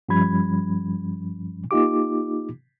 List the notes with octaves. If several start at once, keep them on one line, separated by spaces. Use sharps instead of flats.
G2 F3 G3 C#4 B5 G#6
A#3 D#4 F4 G4 D6